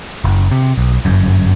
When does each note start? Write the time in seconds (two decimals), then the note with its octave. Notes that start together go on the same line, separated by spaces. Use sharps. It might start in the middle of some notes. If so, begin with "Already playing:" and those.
0.24 F#1
0.51 C3
0.78 B1
1.05 G1 F#2